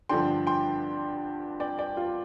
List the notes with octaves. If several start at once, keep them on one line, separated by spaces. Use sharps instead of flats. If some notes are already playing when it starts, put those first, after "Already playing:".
G2 D3 F3 D4 G5 C6
G5 C6
D5 G5
D5 G5
F4